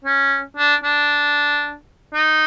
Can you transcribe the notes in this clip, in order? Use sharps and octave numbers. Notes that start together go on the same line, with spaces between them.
C#4
D4
D4
D#4